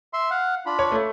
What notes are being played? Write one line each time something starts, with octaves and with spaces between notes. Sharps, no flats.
E5 C6
F5 F#5
D4 F4 B5
C#5
A3